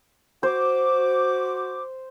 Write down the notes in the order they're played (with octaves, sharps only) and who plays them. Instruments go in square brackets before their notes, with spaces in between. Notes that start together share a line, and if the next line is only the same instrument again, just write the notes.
[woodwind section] F#4 D6 [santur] C5